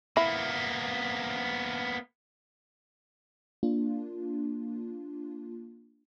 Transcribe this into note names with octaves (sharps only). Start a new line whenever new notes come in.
A#3 B3 E4
A#3 D4 F4